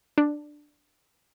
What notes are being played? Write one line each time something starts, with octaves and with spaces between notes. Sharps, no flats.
D4